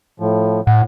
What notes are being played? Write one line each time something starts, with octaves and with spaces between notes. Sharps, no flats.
A2 F3
A2 F#5